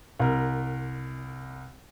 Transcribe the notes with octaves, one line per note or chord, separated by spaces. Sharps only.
C2 A#4